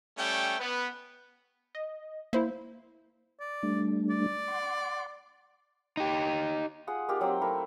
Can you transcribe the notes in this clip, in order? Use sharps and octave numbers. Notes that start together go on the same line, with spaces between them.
G3 A3 C#4 G5
B3 B4
D#5
A#3 E4 C5 E5
D5
G3 A3 D4
D5
F#5 C6
D#4 G4
F4 G#4 F#5 D#6
A#3 D#4 F4 G4
F#3 C4 G5 C6
A3 E4 A#4 C5